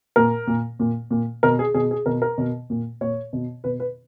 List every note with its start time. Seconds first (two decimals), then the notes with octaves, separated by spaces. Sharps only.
0.16 A#2 A#4
0.47 A#2
0.79 A#2
1.11 A#2
1.43 B2 A#4
1.59 G#4
1.74 B2 G#4
1.91 G#4
2.06 B2 A#4
2.22 A#4
2.38 B2
2.70 A#2
3.01 A#2 C#5
3.33 B2
3.64 B2 B4
3.80 B4